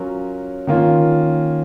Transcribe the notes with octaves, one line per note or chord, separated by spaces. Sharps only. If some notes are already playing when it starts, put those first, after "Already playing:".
Already playing: F#3 C#4 F4 A#4
D#3 A#3 C#4 F4